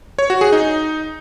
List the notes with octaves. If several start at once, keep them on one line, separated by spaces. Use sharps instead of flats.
C#5
F#4
G#4
D#4